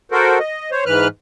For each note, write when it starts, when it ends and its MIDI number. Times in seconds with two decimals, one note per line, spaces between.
0.12 0.39 66
0.12 0.39 69
0.12 0.39 70
0.12 0.39 72
0.40 0.70 75
0.71 0.84 72
0.71 0.84 73
0.86 1.08 44
0.86 1.08 52
0.86 1.08 71
0.86 1.08 89
0.86 1.08 90